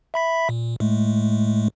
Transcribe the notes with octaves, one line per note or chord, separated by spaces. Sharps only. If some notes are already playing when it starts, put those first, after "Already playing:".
E5 B5 B6
A#2
A2 G#3 A3